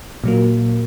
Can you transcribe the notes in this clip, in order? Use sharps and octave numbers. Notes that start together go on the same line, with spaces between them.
A#2 F#3 A#3